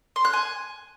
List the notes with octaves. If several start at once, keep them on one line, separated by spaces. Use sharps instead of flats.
C6
F#6
G#5